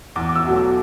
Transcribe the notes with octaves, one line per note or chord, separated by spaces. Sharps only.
E2 D6
D6
E6
B2 F#3 A3
D6